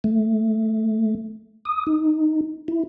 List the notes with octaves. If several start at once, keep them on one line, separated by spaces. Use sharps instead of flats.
A3
D#6
D#4
E4